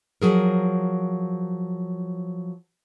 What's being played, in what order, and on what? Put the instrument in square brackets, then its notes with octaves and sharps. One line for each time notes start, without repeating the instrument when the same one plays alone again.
[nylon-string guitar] F3 F#3 G#4 A#4